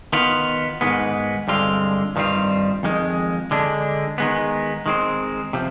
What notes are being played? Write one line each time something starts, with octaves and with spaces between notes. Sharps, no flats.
D#3 B3 F4
G#2 D#3 G#3 B3
G2 D3 G#3 C4 F4
G2 D#3 G3 C4 F4
F2 D#3 G#3
D3 G#3 D4
D#3 G#3 B3
D#3 G#3 C4
C3 F3